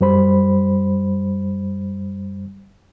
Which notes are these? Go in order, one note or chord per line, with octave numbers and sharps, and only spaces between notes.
F#2 G3 C5 B5